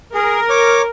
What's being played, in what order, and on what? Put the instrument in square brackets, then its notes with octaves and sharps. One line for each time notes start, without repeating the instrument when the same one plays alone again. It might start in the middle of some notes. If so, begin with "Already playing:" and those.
[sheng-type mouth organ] G#4 [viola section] A#4
[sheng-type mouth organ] C#5 D6